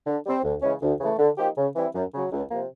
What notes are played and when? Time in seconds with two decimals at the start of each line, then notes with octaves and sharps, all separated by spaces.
0.06 D3
0.25 G3 C4
0.43 D2
0.62 C#3 E3 G#3 C#4
0.82 D2
1.00 C#3 E3 A3
1.18 D3
1.37 F3 A#3 D#4 G4
1.56 C#3
1.75 E3 G3 C4 E4
1.94 F#2
2.12 C#3 F#3
2.31 C#2
2.50 C3 F3 A#3